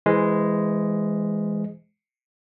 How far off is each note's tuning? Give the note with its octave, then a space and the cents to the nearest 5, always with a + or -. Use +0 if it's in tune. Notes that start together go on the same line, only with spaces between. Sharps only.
E3 +0 G#3 +0 C5 -20